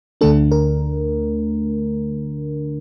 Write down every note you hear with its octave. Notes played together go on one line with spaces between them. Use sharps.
D2 D3 A3 D4 A4
A#4